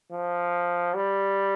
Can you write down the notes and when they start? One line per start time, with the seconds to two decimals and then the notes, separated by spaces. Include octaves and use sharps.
0.11 F3
0.95 G3